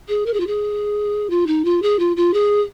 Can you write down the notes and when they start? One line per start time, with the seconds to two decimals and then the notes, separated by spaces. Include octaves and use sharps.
0.08 G#4
0.26 A#4
0.33 G#4
0.40 F4
0.47 G#4
1.30 F4
1.46 D#4
1.64 F4
1.82 G#4
1.99 F4
2.16 F4
2.33 G#4